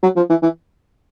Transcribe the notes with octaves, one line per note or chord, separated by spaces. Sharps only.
F#3
F3
E3
E3